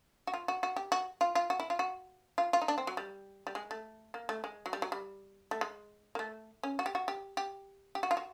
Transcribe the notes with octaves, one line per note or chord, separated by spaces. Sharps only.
F#4
F4
F#4
F#4
G4
F#4
F4
F4
F#4
E4
F4
F#4
F4
F4
D#4
D4
C4
F#3
G3
G3
G#3
A3
A#3
A3
G#3
F#3
G3
F#3
G3
A3
G#3
A#3
A3
C#4
F#4
G4
F#4
G4
G4
G4
F#4
F4
F#4